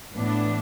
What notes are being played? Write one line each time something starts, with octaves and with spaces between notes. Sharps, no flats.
A2 E3 B3 D4